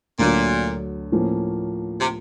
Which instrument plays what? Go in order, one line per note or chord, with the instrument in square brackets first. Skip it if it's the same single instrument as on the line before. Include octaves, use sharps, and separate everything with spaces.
[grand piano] D2 D3 F#3 [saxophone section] A#2
[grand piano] A2 F3 A#3 C#4
[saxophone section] C3